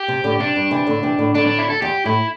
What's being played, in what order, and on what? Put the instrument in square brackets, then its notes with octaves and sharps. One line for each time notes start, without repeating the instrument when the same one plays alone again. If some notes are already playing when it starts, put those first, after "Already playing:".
Already playing: [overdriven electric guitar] G4
[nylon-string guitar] C3
A2 D3
[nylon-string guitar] C3 [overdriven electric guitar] D4
[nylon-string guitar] G2
C3 E3
A2 D3
C3 E3
A2 D3
[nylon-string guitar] A2 D3 [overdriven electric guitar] D4
[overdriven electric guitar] D4
E4
A4
[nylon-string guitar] E2 [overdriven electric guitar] G4
[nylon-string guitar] A2 [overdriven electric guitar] E4